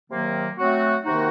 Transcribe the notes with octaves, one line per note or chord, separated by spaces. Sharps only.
C3 D#3 F#3 A#3
F#3 A3 C4 F#4
C3 D#3 A#3 D#4 F#4